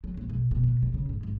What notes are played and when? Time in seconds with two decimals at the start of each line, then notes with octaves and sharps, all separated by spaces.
0.04 F#3
0.17 A#1
0.30 B2
0.51 B2
0.64 B2
0.83 G3
0.94 C#3
1.09 G#2
1.23 G#1